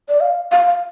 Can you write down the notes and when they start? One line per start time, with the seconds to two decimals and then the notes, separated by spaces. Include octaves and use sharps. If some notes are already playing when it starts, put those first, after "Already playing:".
0.09 D5
0.21 F5
0.51 F5
0.67 F5